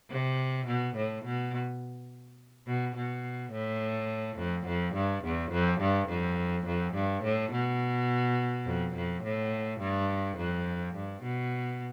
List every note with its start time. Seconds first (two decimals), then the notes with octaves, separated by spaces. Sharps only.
0.11 C3
0.67 B2
0.96 A2
1.25 B2
2.66 B2
2.96 B2
3.52 A2
4.38 F2
4.67 F2
4.95 G2
5.24 E2
5.52 F2
5.81 G2
6.09 F2
6.67 F2
6.94 G2
7.24 A2
7.52 B2
8.66 F2
8.95 F2
9.24 A2
9.80 G2
10.37 F2
10.95 G2
11.23 B2